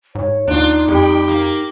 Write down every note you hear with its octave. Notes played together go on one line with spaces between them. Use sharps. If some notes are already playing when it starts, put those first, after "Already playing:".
G#2 C#5
D#2 D4 D#4 F4
F2 G3 G4
A#3 A#4